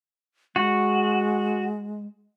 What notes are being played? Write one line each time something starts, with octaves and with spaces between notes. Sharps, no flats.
G#3 F#4